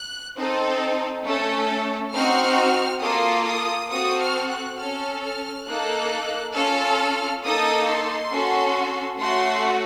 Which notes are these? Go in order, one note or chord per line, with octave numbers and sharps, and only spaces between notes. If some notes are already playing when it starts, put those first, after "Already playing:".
Already playing: F#6
C4 D#4 A4
A3 C#4 A4
C4 D#4 F#4 F6
A#3 F4 A4 D#6
D#6
C4 F#4 A4 D#6
F6
F#6
C#4 A4 F6
F6
A#3 D#4 A4 F#6
C#4 F4 A4 F6
A#3 D#4 A4 D#6
C6
C#4 F#4 A4
A3 C#4 F#4 C6